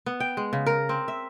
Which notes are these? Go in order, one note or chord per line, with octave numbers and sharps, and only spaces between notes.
B3
G5
G#3
C#3
A#4
C4
E5